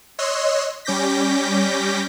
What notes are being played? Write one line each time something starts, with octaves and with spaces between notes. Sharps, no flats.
C#5 D#5 C6 E6 F#6
G3 C#4 D6 G6 A#6 B6